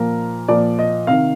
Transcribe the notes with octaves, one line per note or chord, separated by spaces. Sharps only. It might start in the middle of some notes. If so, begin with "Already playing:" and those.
Already playing: A#2 F3 A#4
A#2 F3 D5
D#5
C3 D#3 F5